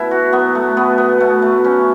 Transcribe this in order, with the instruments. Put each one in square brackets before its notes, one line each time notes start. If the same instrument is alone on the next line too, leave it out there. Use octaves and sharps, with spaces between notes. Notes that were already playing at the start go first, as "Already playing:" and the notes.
Already playing: [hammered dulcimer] B2 E4
F#4
F#3 B3
A3
B2 B3
B3
B2 A3
A3
F#3 C#4